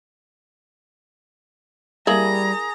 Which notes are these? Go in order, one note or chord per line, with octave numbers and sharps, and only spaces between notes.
G3 A#3 E4 G#4 A#5